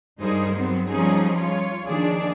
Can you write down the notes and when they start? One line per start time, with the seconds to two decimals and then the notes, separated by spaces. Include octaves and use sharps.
0.19 G2 G3 D#4 G#4 A#4 C5
0.53 F#3 B3 C4
0.89 F3 G3 C#4 D#4 G#4
1.36 F4 C#5
1.88 D#3 F3 A#3 D4 G#4 D5